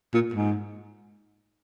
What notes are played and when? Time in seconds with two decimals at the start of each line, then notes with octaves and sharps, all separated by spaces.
0.14 A#2
0.34 G#2